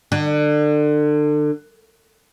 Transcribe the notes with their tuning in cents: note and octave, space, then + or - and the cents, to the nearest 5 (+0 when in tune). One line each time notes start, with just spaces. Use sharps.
D3 +30